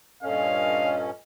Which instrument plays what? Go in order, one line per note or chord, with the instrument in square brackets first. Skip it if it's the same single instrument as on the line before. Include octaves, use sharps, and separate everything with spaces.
[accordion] G2 A#2 C#4 [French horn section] A4 D#5 [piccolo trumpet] F5